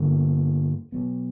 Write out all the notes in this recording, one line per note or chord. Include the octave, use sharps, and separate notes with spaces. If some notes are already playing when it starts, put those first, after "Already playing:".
Already playing: G2 D3 G3 A#3
B2 F#3 B3